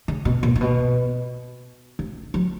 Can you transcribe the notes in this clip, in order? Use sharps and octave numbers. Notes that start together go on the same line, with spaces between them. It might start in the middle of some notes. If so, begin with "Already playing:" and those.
C#3
B2
A#2
A#2
B2
C#3
F#3